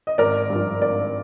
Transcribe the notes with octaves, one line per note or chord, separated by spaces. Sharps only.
D#5
G#1 A#4 D5
G2 F3
G#1 A#4 D5